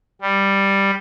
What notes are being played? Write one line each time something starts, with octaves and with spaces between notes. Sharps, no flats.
G3